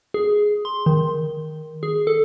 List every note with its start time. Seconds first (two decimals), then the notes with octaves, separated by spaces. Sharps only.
0.14 G#4
0.65 C6
0.86 D#3
1.83 G#4
2.07 A4